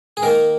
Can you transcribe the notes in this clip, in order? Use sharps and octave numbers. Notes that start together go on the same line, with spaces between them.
G#4
D#3 A#3 A#4